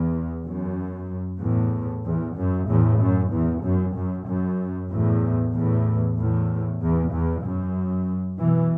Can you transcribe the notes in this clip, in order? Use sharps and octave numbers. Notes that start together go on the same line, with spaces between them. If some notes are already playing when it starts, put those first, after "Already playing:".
Already playing: E2
F#2
E2 A2
E2
F#2
E2 A2
F#2
E2
F#2
F#2
F#2
E2 A2
E2 A2
E2 A2
E2
E2
F#2
B2 E3